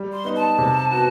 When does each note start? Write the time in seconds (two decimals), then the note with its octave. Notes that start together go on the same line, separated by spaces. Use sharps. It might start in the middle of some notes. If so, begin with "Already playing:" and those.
Already playing: G3
0.13 C6
0.24 B3 D#4
0.36 A5
0.58 C3
0.91 B3 F#4